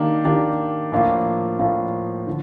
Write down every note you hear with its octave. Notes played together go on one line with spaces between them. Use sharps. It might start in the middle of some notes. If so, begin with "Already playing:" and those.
Already playing: D#3 A#3 D4 G4
D#3 A#3 D4 G4
A2 F3 A#3 D4 F4
A2 F3 A#3 D4 F4
D3